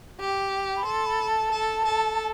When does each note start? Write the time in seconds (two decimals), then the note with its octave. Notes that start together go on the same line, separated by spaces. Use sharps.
0.19 G4
0.77 B5
0.85 A4 C6
1.06 B5
1.29 A5
1.51 A4
1.84 A4